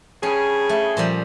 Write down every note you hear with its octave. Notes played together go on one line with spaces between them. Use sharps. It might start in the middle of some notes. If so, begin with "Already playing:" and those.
G2 C#3 C#4 G#4
A3
A#2 F3 G3